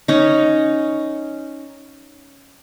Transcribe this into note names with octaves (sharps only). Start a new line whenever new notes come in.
C#4 D#4